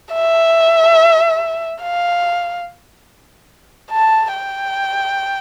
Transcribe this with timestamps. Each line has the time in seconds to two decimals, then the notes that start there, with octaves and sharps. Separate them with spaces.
0.14 E5
1.82 F5
3.91 A5
4.34 G5